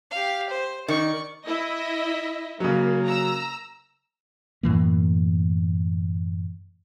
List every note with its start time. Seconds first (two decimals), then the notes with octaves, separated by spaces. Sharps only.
0.11 G4 F5
0.50 C5
0.88 D#3 D5 C#6
1.46 E4 D#5 E5
2.60 C#3 F#3 A#3
3.07 A#5 E6
4.63 F#2 A2 E3 A#3